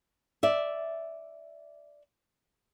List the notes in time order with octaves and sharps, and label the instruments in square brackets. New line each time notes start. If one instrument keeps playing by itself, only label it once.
[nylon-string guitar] D5 E5